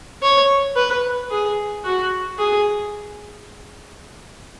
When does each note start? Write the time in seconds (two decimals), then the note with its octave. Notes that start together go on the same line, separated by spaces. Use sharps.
0.23 C#5
0.76 B4
1.31 G#4
1.85 F#4
2.39 G#4